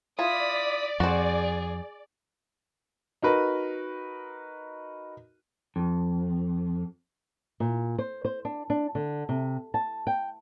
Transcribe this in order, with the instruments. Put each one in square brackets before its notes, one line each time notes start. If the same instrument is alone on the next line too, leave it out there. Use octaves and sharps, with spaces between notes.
[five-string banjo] E4 F4 [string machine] D5 [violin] D#6 B6
[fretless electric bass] F2 [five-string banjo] F#4 C5 [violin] G#4
[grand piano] D#4 F#4 A#4 B4
[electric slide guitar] F2
[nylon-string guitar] A#2
C5
C5
D4
D4
D3
C3
A5
G5